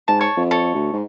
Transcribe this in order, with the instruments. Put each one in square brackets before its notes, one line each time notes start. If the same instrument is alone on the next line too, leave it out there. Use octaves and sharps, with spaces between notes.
[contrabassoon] G#2 [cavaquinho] A5
[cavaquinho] C#5 A5 C#6
[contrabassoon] F2
[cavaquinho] A4 C#5
[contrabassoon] D2
G#2